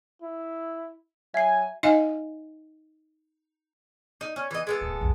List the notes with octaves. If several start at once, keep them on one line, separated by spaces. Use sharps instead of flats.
E4
F#3 E5 G#5 C7
D#4 D#5 F5 G#5
D#4
C#4
E3 D#5
G#3 B3 A4
D1 C3
C2 F2